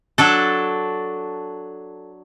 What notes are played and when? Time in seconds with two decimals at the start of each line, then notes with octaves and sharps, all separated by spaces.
0.18 F#3 D4 A4